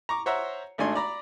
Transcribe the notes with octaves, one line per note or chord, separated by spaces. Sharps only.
A#5 C#6 D6
C5 C#5 E5 F#5 A#5
G#1 A3 D4 D#4 G#5 C6
D5 A#5 B5